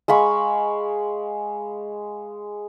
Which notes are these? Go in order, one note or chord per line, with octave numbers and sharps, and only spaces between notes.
G#3 F5 B5 C#6